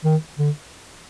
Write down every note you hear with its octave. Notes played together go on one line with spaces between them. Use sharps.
D#3
D3